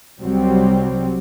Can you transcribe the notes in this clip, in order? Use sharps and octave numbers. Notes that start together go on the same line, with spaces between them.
C2 F#3 G3 C4